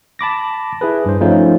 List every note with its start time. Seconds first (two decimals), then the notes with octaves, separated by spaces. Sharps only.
0.19 A5 B5 D6 A#6
0.81 E4 G#4 B4
1.06 G2 C5
1.21 F3 A3 C#4 D#4 F4 C5